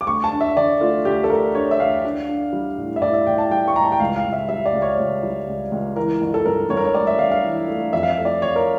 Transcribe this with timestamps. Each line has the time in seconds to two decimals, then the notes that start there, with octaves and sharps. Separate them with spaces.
0.01 D6
0.07 D2 C#6
0.24 A5
0.32 D4
0.41 E5
0.57 D3 D5
0.81 A3 F4
1.05 D2 G4
1.24 A4
1.30 A3 A#4
1.55 D4 C#5
1.71 E5
1.80 D2 F5
2.04 D4
2.29 D4
2.53 G3
2.78 A2
2.96 E5
3.02 A2 D5
3.14 E5
3.27 A2 G5
3.38 A5
3.51 G3 G5
3.68 C#6
3.76 A2 A#5
3.84 A5
3.92 G5
4.00 C#2 F5
4.16 F5
4.25 C#2
4.33 E5
4.49 G3 E5
4.66 D5
4.73 C#2
4.82 C#5
4.98 C#2
5.23 G3
5.48 C#2
5.72 C#2
5.96 E3 A#4
6.21 G1
6.34 A4
6.46 G2 A#4
6.70 G2 C#5
6.77 A#4
6.85 C#5
6.94 A3 D5
7.07 E5
7.19 G2 F5
7.31 F5
7.44 E3
7.68 A3
7.93 F2 E5
8.03 F5
8.10 E5
8.18 A3
8.25 D5
8.42 F2 C#5
8.56 A#4